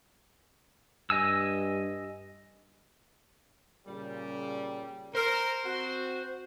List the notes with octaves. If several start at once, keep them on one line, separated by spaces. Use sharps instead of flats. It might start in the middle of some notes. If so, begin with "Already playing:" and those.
G2 D#5 G#5 E6
A#2 C#3 G3
A#4 C5
C4 F#4